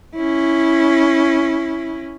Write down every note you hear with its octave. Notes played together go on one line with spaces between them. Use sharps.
C#4 E4